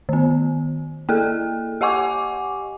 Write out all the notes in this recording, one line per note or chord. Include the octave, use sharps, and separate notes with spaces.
D#3 B3
A#3 G#4 A4
G4 D#5 F#5 G#5 C#6 D6